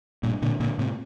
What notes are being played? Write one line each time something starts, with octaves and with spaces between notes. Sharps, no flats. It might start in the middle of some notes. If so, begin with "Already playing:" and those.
G2 A#2
A#2 D3
A#2 D3
A2 C3